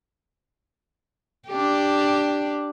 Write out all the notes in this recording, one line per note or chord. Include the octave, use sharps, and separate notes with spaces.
D4 G4